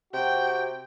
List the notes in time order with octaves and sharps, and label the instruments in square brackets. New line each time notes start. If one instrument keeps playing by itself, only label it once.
[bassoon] C3 [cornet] F#4 [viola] G5